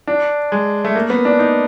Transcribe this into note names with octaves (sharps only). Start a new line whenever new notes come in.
D4
G#3
A3
A#3
B3
D4
D#4